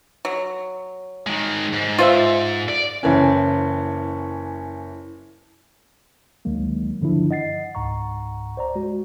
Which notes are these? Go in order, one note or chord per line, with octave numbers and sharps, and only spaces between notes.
F#3
D#3 G#3
G#2
F4 C5 E5
D5
F#1 E3 C#4
D2 D#3 F#3 G#3 A#3
G2 D3 D#3 F3 D4 E4
D#5 F#5 A6 C7
C#2 G#2 F#5 A#5 C#6
C5 D5 A#5
G#3 F#4